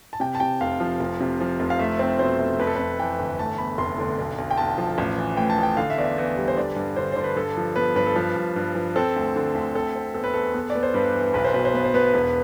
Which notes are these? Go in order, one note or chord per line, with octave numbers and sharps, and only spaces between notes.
A5
C3 G5
A5
C3 G5
F1 F5
F3
F1
C3
F3
F1
F5
A3 E5
C4
B2 C5
A3
F2 B4
A4
F2 B4
E3 G5
G1
A3 A5
E2 B5
F1 C6
D3
B1
B1
G5
B1 A5
F3
A1
E3
A2 G5
A5
A1 G5
D3 F5
E5
E2 D5
E5
E2
G3
C5
D3 D5
G2
D3 C5
D3 C5
B4
G2 A4
F3
B3 B4
G2 B4
A4
F3 B4
G2
G2
F3
C4 A4
D2
D3
D2
C4 A4
C4
E2 A4
B4
E2 A4
B3
D5
B3
C5
G2 B4
E3
B1 B4
C5
B2 B4
C5
B3 B4
C5
B3 B4
E1